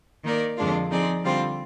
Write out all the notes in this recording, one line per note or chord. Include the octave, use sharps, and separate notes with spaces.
D#3 A#3 D#4 A#4 D5
F2 D3 G#3 D4 F4
F3 C4 D#4 G#4 D5
D3 G3 C4 F4